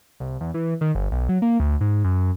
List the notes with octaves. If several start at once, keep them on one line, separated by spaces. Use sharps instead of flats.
C2
E2
E3
D#3
G1
B1
F#3
A#3
D2
G#2
F#2